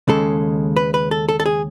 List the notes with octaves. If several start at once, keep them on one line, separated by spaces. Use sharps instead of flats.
D#2 C#3 G#3 A4
B4
B4
A4
A4
A4
G#4